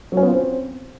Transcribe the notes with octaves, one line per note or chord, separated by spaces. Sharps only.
F#3
C#4
B3
F4
C4